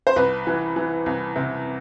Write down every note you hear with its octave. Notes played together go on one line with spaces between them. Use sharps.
C5
C2 B4
E3
E3
C2
C3